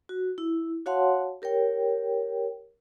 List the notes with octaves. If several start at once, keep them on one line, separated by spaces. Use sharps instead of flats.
F#4
E4
F#4 C#5 F5 F#5 A5 C6
G4 A#4 C#5 G5